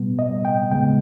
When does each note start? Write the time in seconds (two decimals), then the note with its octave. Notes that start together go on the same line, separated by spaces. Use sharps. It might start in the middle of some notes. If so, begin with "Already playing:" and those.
Already playing: B2 G3 B3
0.19 D#5
0.45 G5
0.71 E2 C#3 G#3 B3 G5